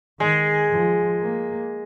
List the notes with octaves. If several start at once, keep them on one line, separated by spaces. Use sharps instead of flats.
D#3 G#3
F3
A#3